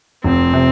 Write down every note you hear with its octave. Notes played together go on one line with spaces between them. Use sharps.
F1 C4
C3